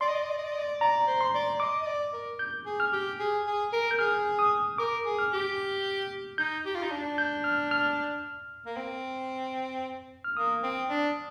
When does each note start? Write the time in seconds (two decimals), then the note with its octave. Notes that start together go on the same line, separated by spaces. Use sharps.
0.01 D5 C6
0.08 D#5
0.15 D5
0.23 D#5
0.30 D5
0.38 D#5
0.44 D5
0.53 D#5
0.59 D5
0.81 D5 A#5
1.07 C5
1.21 C6
1.34 D5
1.60 D#5 D6
1.82 D#5
1.87 D5
2.13 A#4
2.39 G6
2.66 G#4
2.80 F6
2.92 G4
3.19 G#4
3.47 G#4
3.73 A#4
3.91 G6
3.99 G#4 F6
4.39 D#6
4.78 A#4 D6
5.06 G#4
5.19 F6
5.33 G4
6.38 D#4 G6
6.65 G4
6.75 F4
6.82 D#4
6.91 D4
7.18 G6
7.44 F6
7.71 F6
8.66 A#3
8.77 C4
10.24 F6
10.36 A#3 D#6
10.63 C4
10.90 D4